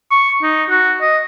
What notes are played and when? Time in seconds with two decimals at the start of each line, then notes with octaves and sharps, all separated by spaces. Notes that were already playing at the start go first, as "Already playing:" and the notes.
0.11 C#6
0.42 D#4
0.70 F#4
1.01 D#5